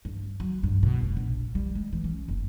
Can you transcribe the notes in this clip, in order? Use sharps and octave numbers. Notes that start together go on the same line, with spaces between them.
G2
F#3
G2
B2
F1
A#1
G3
G#3
E3
C#4
F#1